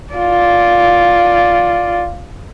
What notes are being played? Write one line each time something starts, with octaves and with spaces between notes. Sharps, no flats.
F4 D5